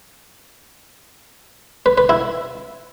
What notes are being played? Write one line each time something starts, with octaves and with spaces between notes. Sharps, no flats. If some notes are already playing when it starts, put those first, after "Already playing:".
B4
B4
E4